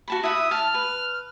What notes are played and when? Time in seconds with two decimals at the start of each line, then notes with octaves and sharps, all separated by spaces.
0.08 F#4 A5 B5
0.23 E4 E5 F#5 D#6
0.51 A5 F6
0.74 B4